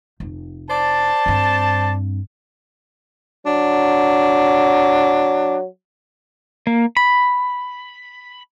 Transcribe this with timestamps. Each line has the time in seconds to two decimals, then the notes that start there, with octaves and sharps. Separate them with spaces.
0.20 F1
0.70 C5 D5 A5
1.26 G2 C4
3.46 F#3 D4
6.67 A#3
6.97 B5